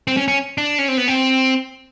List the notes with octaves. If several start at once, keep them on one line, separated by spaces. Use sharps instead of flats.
C4
C#4
C#4
D4
C#4
C4
B3
C4